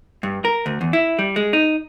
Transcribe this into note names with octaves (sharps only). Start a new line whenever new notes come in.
G2
A#4
D2
E2
E4
G3
G#3
D#4